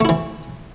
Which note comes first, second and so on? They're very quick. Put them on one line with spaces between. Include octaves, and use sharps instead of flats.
A3 E4 E3